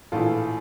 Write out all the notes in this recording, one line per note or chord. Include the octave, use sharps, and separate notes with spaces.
A#1 A2 E3 F4 A4